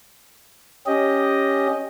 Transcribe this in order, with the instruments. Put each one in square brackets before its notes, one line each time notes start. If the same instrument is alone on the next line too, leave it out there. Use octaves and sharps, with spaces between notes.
[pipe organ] C#4 G4 D#5